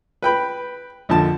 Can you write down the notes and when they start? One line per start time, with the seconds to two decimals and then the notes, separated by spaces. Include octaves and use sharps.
0.22 B4 G5 B5
1.09 A#1 F2 D3 A5